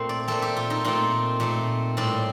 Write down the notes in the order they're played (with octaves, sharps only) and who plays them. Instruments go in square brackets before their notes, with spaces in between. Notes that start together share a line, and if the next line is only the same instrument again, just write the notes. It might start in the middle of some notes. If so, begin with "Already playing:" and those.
Already playing: [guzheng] A#2 A3 C4 C5
D5
A#2 A3 C4 A4
G4
F4
D#4
A#2 A3 C4 F4
A#2 A3 C4
A2 G3 C4 D5